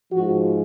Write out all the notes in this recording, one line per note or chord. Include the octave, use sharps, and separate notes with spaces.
G#2 F3 F#4